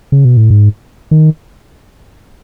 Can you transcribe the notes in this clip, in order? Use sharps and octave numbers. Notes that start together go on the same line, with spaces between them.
C#3
B2
A2
G#2
D#3